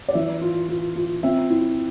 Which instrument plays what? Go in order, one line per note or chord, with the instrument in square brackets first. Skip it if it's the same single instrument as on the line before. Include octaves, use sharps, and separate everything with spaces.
[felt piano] D5
E3 E5
F4
F4
F4
C4 E5
E4